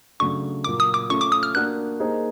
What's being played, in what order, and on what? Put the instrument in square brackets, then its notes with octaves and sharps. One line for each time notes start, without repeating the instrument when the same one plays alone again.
[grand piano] C#3 F#3 A3 D4 [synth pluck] C#6
[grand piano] A#2 F#3 A#3 [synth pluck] D6
[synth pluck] D#6
D6
[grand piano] A3 C#4 F4 [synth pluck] C#6
[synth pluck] D6
D#6
F6
[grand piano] A#3 D4 F#4 A#4 [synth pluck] F#6
[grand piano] A#3 D#4 G#4 C5